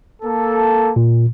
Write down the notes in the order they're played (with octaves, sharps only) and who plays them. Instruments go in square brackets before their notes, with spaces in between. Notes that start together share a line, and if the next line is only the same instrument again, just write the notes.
[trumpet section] A#3 A4
[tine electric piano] A#2